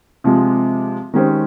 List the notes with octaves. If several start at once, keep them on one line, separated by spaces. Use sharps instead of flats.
C3 F3 G#3
D#3 G#3 C#4 G4 C5